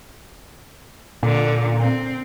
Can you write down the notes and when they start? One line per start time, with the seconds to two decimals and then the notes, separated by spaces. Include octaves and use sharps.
1.23 A#2 D3
1.79 C4